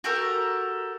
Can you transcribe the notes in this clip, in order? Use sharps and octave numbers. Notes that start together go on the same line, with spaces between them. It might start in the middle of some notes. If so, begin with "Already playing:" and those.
F#4 G4 A4 A#4